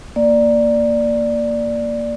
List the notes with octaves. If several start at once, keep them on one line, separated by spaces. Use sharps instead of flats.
A#3 D5